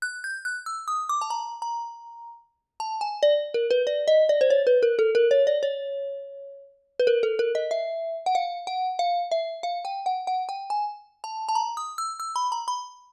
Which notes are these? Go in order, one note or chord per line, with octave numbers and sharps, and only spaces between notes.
F#6
G6
F#6
E6
D#6
D6
A5
A#5
A#5
A5
G#5
D5
A#4
B4
D5
D#5
D5
C5
C#5
B4
A#4
A4
A#4
C#5
D5
C#5
B4
A#4
A4
A#4
D#5
E5
F#5
F5
F#5
F5
E5
F5
G5
F#5
F#5
G5
G#5
A5
A5
A#5
D#6
E6
E6
B5
A#5
B5